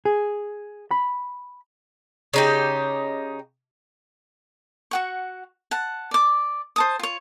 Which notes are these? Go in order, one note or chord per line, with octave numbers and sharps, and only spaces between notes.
G#4
B5
C#3 D#4 G4
F#4 F#5 C#6
F#5 A5
D5 D6
C5 A5 D#6
F4 C#5